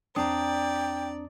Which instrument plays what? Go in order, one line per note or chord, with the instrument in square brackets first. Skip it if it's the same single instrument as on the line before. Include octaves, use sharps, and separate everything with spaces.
[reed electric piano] E2 C4 D#6 [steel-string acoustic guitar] D4 A#5 [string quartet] D5 [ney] G5